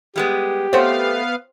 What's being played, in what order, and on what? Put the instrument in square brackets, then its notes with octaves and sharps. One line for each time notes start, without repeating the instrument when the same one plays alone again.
[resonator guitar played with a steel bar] G3 G#3 B3 [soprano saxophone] G4
[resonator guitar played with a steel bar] A3 F#5 [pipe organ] B3 F5 [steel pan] C5 C#5